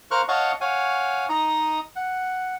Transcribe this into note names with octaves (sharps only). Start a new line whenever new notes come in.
A#4 C5 F5 C#6 F6 F#6
C#5 D#5 F5 F#5 A5 C#6
C#5 F5 F#5 G#5
D#4 D#5 A#5 D#6
F#5